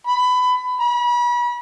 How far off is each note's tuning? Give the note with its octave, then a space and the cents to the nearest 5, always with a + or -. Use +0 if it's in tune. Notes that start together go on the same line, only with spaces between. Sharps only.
B5 +20
B5 -35